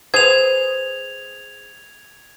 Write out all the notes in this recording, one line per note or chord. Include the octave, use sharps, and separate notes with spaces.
G#4 B4 C5 G#6 F7